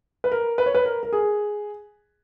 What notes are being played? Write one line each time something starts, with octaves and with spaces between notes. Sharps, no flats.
B4
A#4
B4
C#5
B4
A#4
A#4
G#4